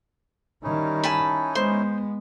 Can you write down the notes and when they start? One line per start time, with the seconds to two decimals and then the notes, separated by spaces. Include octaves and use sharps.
0.64 D#3 G3 C#4 D#4 E4
1.04 G#5 A5 B5
1.55 G#3 B3 C5